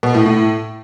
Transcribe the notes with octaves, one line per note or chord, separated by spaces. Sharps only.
B2
A2
A2